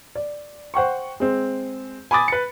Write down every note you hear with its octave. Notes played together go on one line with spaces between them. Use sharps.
D5
C5 F#5 G5 C#6
G#3 C4
G#5 B5 D6 D#6 A6
B4 C#7